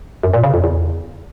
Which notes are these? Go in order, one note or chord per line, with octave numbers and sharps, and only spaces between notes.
F#2
A#2
C#3
F2
E2